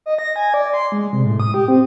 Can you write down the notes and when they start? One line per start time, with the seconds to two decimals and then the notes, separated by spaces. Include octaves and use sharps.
0.06 D#5
0.19 A#6
0.36 G#5
0.54 D5
0.74 C6
0.92 G#3
1.13 C3
1.24 A2
1.40 D#6
1.54 G4
1.68 C4